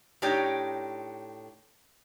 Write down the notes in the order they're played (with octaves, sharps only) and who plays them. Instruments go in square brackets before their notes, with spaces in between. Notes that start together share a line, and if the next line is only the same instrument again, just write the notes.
[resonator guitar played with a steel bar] A2 D4 D#4 G4 C#5